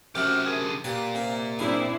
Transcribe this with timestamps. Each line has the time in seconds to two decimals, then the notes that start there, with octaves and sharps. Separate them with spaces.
0.15 F#2 C3 A3 G4 F#5 F6
0.46 D3 G#4 A#4
0.84 A#2 G4 B4 F5
1.15 C3 A#3
1.59 C4 D4 E4 G#4